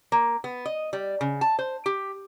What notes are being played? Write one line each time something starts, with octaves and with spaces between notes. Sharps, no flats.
A#3
B3
D#5
G3
C#3
A5
C5
G4